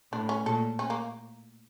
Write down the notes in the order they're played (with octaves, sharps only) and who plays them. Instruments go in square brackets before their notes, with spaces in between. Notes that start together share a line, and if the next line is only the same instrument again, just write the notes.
[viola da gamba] A2 [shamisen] D4
[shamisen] C#4
[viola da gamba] A#2 [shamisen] A4
[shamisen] C#4
A#3